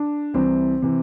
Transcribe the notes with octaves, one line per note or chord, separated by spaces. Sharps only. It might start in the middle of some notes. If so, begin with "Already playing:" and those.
Already playing: D4
C2 C3 E3 C4
C3 E3